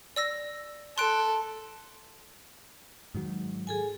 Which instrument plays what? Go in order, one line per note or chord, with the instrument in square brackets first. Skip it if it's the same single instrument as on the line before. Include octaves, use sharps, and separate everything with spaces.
[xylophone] D5 E6 A#6
[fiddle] A4 [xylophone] C6 F#6 D7
[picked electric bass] G#2 D#3 F#3
[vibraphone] G#4 A4 G#5